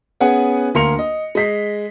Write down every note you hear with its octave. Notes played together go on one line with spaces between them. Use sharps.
B3 C#4 G#4 F#5 G#5
D2 A#3 A#4 C6 C#7 F7
D#5
G#3 D#5 B6 C7